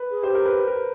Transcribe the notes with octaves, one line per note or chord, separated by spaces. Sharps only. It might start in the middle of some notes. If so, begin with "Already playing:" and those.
Already playing: B4
G#4
G4 C5
A#4
B4
A#4